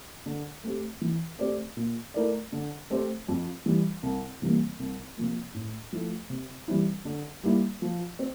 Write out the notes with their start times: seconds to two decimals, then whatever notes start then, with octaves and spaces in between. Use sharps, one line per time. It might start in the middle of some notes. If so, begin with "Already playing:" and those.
0.26 D3
0.64 A3 C4 G4
1.01 E3
1.39 A3 C4 G4 D5
1.77 A#2
2.14 A3 E4 A#4 D5
2.52 D3
2.90 A3 C4 G4 C5
3.28 F2
3.66 E3 G3
4.03 C2
4.42 C3 E3 G3 A#3
4.80 C2
5.17 C3 F3 A#3
5.54 A2
5.92 F3 A3 E4
6.30 C3
6.68 E3 G3 C4 E4
7.05 D3
7.43 G3 A#3 E4
7.82 F3
8.19 C4